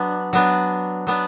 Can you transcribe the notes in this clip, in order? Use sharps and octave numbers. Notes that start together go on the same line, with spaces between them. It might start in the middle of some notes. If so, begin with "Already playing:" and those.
Already playing: F#3 B3 D4
F#3 B3 D4
F#3 B3 D4